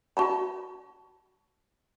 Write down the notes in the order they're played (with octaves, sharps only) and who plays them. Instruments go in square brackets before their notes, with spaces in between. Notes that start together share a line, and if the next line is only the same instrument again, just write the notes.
[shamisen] F#4 A5 B5